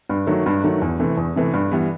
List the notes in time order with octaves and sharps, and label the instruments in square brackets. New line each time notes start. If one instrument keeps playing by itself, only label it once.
[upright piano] G2
D#3 F#3 A3
G2
D#3 F#3 A3
E2
C3 E3 A3
E2
C3 E3 A3
G2
E3 G3 B3